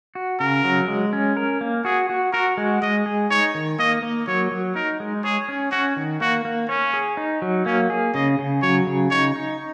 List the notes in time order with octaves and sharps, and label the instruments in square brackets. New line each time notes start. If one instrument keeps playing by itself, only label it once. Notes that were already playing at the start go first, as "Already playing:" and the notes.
[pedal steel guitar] F#4
[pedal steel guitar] C#3 [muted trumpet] A#4
[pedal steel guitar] F#3
G#3
C#4
A#4
A#3
[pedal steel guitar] F#4 [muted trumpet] G#4
[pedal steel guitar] F#4
[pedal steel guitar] F#4 [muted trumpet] A#4
[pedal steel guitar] G#3
[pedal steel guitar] G#3 [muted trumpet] D#5
[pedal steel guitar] G#4
[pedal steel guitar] D#4 [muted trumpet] C#5
[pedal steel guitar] D#3
[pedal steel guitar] A#3 [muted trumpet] D#5
[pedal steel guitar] A#3
[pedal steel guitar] F#3 [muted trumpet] C#5
[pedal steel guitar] F#3
[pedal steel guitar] D#4 [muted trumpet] A#4
[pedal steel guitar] G#3
[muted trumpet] G#4 [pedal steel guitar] C#5
[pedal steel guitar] C#4
[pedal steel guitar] C#4 [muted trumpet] F#4
[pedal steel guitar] D#3
[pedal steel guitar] A#3 [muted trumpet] F#4
[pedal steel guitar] A#3
[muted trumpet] C#4 [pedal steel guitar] C#5
[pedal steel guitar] G#4
D#4
F#3
[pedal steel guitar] A#3 [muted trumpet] C#4
[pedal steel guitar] G#4
[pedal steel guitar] C#3 [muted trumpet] D#5
[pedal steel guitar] C#3
[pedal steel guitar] F#3 [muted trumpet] C#5
[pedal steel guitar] C#3
[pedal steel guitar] D#4 [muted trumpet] C#5
[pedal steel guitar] D#4